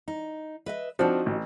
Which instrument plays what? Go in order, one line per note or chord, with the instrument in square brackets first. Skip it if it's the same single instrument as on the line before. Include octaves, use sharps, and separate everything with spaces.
[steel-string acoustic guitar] D#4
B4 D#5 E5
[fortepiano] F3 C4 D4 [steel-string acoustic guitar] D#4 F#4
[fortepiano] A1